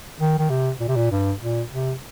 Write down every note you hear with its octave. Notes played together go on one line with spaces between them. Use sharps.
D#3
D#3
C3
A#2
C3
A#2
G2
A#2
C3